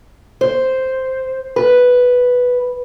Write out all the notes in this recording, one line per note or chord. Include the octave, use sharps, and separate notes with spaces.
C5
B4